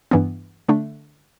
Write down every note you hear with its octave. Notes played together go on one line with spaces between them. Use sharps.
G2 E3 B3
D3 A3 D4